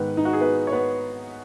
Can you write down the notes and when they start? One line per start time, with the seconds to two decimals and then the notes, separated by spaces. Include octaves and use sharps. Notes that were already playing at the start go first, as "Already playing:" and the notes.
Already playing: G#2 D#3 B3 B4
0.17 D#4
0.25 F#4
0.33 G#4
0.41 B3 B4
0.67 C#5
0.72 B3 B4